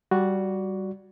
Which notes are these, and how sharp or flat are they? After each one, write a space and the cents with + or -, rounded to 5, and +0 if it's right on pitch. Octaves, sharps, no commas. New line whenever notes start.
G3 -10 F#4 +0 D5 -10